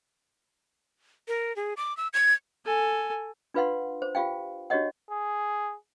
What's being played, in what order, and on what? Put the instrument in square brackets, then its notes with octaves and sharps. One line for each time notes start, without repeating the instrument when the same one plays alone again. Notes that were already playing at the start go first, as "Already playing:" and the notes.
[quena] A#4
G#4
D6
E6
G#6
[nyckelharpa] A4 G#5
[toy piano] D4 F4 B4 F5 F#5 C6
C5
F4 G4 F5 G5
D4 F#4 G4 C#5 D#5 F#5
[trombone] G#4